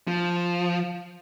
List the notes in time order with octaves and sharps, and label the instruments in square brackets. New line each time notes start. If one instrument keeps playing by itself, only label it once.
[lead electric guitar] F3